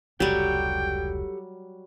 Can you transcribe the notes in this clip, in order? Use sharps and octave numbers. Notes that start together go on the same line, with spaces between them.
F1 C#2 F#3 G3 G4 A4 G5